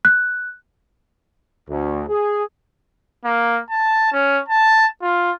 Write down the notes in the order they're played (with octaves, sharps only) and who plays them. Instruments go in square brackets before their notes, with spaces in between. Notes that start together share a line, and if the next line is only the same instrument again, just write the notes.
[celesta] F#6
[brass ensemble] D2
G#4
[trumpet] A#3
A5
C#4
A5
F4